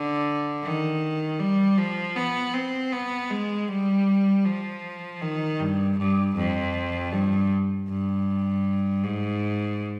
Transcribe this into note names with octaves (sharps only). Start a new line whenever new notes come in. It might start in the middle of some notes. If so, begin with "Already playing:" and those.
Already playing: D3
D#3
G3
F3
B3
C4
B3
G#3
G3
F3
D#3
G2
G2
F2
G2
G2
G#2